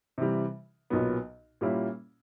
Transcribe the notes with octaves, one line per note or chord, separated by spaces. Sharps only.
C3 E3 G3
B1 A#2 F#3 B3
A#2 G3 A#3 C#4 E4